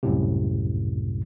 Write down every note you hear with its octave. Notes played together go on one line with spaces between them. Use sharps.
C2 F#2 A2 C3